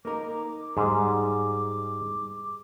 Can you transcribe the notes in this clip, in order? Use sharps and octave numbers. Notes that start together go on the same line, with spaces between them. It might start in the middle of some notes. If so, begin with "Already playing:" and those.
A#3 D#4 A#4 D6
G#2 G3 G#3 G#4